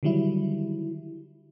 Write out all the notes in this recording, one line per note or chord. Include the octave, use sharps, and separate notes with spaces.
D3 D#3 F#3 G3 E4